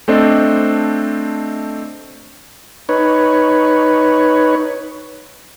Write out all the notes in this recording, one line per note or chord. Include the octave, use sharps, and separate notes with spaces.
A3 C4 D4 A4 C5 D#5
D#4 B4 C#5